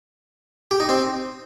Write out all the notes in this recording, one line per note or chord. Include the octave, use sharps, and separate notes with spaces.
G4
D#4
C4